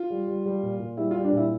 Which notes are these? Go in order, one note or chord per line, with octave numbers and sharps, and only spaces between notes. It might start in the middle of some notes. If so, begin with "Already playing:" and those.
Already playing: F4
G3
G3
G3
A#2
A#2
G3 E4
G3 F4
D4
A#2 E4